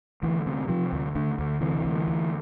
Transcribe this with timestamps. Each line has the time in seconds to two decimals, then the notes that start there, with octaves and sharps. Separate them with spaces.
0.23 D2 E3
0.46 C3
0.68 C3 F3
0.92 D2
1.15 D2 D3
1.39 D2
1.61 C3 E3
1.85 D2
2.07 D2